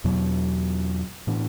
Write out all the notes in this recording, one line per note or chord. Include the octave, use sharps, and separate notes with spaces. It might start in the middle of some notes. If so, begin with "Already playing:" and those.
E2 B2 F#3
A2 E3 B3 D4